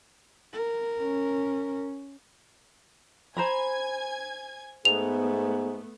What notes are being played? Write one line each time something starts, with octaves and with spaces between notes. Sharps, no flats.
A#4
C#4
C5 G#5 A#5 B5 G#6
G#2 A3 B3 F7